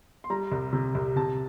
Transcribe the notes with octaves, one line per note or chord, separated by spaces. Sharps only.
C6
G3 A#5
C2
C3
C2
C3 A5